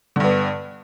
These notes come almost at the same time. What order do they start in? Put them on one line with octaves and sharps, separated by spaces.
D3 G2 B3